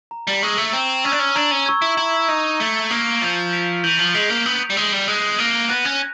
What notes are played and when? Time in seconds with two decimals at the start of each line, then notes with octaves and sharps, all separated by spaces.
0.11 A#5
0.27 G3
0.42 G#3 C#6 E6 G#6
0.58 A3
0.73 C4 A#5
1.05 C#4 C#6 E6 G#6
1.12 D4
1.19 C#4
1.35 D4 A#5
1.51 C#4
1.66 C#6 E6 G#6
1.82 E4
1.97 E4 A#5
2.28 D#4 C#6 E6 G#6
2.60 A3 G6
2.90 A#3 B6 D7 F7
3.21 F3 G6
3.53 B6 D7 F7
3.84 E3 G6
3.99 F3
4.14 G#3 B6 D7 F7
4.30 A#3
4.45 B3 G6
4.70 G3
4.76 G#3 B6 D7 F7
4.92 G3
5.08 G#3 F#6
5.39 A#3 A#6 D#7
5.69 B3 F#6
5.85 C#4